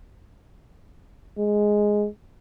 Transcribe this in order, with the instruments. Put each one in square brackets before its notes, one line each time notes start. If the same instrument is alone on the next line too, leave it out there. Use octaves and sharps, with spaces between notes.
[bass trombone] G#3